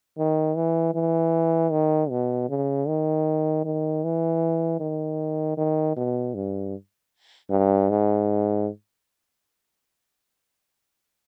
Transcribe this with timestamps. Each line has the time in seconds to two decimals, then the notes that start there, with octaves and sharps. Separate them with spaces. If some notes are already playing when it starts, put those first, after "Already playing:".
0.18 D#3
0.56 E3
0.94 E3
1.71 D#3
2.10 B2
2.49 C#3
2.88 D#3
3.65 D#3
4.04 E3
4.80 D#3
5.57 D#3
5.96 B2
6.35 G2
7.50 G2
7.90 G#2